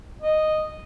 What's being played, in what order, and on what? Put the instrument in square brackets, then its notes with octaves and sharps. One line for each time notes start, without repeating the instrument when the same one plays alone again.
[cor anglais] D#5